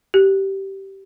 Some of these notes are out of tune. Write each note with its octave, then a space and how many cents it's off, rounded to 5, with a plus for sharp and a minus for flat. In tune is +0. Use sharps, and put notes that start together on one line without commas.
G4 -15